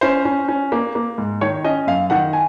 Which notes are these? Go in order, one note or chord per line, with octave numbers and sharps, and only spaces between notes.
C#4 C5
C#4
C#4
A#3
A#3
G#2
D#3 C#5
C#4 D#5
F#2 F5
D#3 F#5
G#5